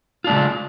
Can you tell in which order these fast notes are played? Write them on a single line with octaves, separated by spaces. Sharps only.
F4 D4 G#3 C#3